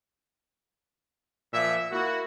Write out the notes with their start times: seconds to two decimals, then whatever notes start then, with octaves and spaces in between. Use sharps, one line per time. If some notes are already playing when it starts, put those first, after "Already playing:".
1.54 A#2 F3 E5
1.92 A#3 E4 F#4